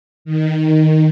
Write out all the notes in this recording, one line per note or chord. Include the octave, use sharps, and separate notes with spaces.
D#3